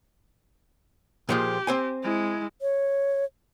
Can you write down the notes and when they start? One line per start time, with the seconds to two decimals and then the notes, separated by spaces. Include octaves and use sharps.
1.29 A#2 F3 G#3 G4
1.67 C4 C5 G#5
2.03 G#3 E4
2.61 C#5